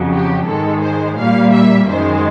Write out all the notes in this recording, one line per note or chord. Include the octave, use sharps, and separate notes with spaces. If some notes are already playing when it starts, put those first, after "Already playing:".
Already playing: F2 C#3 F#3
G4
G#2 D#3 G#3 A4
C5
A#2 G3 A#3 F5
E5
F#2 D#3 G#3 C5